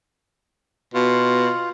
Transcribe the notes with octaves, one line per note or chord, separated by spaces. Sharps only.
B2 F4